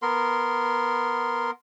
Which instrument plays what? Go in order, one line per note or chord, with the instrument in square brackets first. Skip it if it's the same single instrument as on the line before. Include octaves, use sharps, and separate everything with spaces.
[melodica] B3 A#4 C6